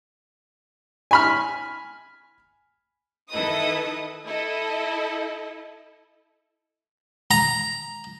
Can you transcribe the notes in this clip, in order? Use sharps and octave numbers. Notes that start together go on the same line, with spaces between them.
G#5 B5 F6
D#3 E4 A4 B4 D#5 D#6
E4 A4 D#5
A#5